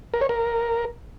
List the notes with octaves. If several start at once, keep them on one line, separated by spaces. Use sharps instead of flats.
A#4
C#5
A#4